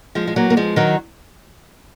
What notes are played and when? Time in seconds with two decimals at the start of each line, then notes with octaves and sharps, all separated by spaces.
0.15 F3 G#3
0.27 G#3
0.36 F#3 A#3
0.50 A#3
0.57 F3 G#3
0.76 D#3 F#3